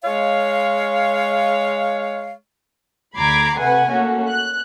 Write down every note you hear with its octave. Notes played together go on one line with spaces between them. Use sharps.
G#3 C#5 F5
D2 A#5 B5 D6 G#6 C7
C3 A3 B4 F#5 G#5
A3 A#3 C#4 F#4
F#6